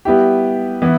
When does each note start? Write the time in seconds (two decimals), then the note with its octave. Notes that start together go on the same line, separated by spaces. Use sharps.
0.05 G3 B3 E4 G4
0.82 E3 B3 E4